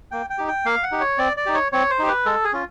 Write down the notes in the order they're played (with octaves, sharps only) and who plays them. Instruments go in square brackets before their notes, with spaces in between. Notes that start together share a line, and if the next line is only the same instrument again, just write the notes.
[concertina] A#3 G5
G5
D#4 G4
G5
A#3 F5
F#5
D#4 G4
C#5
C4 D5
D5
D#4 G4
C#5
C4 C#5
C5
D#4 G4
B4
G#3 A4
G#4
C#4 F4